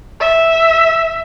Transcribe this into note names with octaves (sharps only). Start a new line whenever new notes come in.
E5